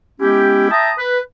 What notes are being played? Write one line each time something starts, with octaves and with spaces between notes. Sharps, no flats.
G#3 B3 C#4 E4 G4
E5 G5 A5 A#5 D#6
B4